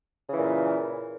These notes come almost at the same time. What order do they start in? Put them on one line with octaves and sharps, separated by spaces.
C#3 E3 A#2